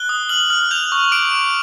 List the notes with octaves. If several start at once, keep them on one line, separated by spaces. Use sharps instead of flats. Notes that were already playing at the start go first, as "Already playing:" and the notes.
Already playing: F#6 G7
D#6
F6 F#7
F6
G6 F7
C#6
D6 D7
D6